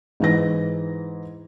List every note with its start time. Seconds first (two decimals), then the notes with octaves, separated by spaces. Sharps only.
0.20 G#2 E3 A#6